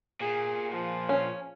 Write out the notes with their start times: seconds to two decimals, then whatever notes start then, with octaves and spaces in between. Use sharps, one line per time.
0.20 A#2 G#4
0.72 F3
1.09 C#4